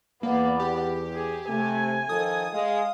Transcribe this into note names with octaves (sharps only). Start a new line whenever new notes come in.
E2 A#3 B3 D5
G4
G#4
C3 A3 G#5
D#3 F3 A4 D#6
G#3 F5